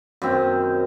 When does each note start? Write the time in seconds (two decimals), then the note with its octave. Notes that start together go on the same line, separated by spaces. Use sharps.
0.22 F#2 D#3 C4